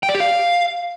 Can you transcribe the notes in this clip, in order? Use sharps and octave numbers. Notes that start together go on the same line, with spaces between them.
G5
D5
G4
F5